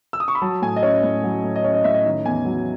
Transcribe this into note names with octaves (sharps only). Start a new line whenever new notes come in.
E6
D#6
C#6
B5
F#3 A5
A2 G#5
D#5
C#4 C#5
A2
F#3
A2
D#5
C#4 C#5
D#5
A2 E5
D#5
D#3
E2 G#5
F#3